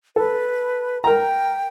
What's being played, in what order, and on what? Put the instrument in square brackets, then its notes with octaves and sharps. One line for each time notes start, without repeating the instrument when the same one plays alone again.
[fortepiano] A4 [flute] B4
[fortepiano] A#4 A#5 [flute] G5